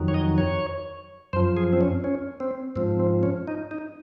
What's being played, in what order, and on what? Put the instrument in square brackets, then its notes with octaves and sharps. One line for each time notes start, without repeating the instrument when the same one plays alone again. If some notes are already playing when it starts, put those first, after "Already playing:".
Already playing: [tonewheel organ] F2 D#3 F#3
C#5
D#5
C#5
F#2 F3 C5
G#4
C4
C#4
C#4
C4
G#2 F3 C4
C4
C#4
D#4
D#4